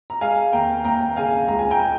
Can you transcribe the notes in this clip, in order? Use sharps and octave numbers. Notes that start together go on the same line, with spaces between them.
A#5
G#3 F5 G#5
D#2 G5 A#5
D#2 G5 A#5
C#3 F5 G#5
C#2 A#5
G#5
G5 A#5
G#3